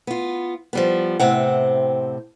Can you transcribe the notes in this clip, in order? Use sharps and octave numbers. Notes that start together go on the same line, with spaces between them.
B3 F4
F3 G3 B3
A2 C3 C4 F#5